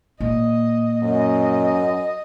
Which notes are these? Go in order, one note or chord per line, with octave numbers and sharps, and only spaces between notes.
A#2 D#5
F#2 D#5